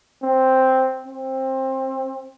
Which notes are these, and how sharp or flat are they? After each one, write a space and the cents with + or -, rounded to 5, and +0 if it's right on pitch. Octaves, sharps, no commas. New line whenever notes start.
C4 +0
C4 +20